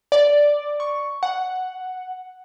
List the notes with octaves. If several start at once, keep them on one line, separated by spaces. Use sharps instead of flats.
D5
C#6
F#5